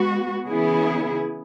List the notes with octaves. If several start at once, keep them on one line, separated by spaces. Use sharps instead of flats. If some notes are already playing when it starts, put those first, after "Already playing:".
Already playing: G#3 B3 F#4
C#3 E3 B3 E4 G#4